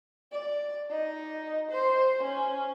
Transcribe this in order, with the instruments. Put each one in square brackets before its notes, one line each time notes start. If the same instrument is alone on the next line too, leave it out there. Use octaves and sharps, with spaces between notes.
[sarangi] D5
D#4
C5
C#4